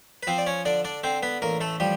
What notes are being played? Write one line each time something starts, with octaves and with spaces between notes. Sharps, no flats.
B4
F3 C4 C5
D5
C#4 C#5
D3 D4 D5
D4 D5
D3 C4 C5
B3 B4
A1 A#3 A#4
A3 A4
F3 G3 G4